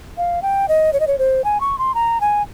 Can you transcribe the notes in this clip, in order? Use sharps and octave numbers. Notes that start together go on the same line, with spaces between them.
F5
G5
D#5
C#5
D#5
C#5
C5
G#5
C#6
C6
A#5
G#5